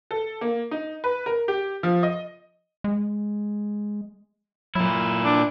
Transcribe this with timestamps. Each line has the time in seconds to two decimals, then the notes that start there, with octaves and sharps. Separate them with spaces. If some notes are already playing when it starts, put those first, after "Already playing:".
0.11 A4
0.41 A#3
0.71 D#4
1.04 B4
1.26 A#4
1.48 G4
1.83 F3
2.03 D#5
2.84 G#3
4.75 A#2 F#3 E4
5.25 D4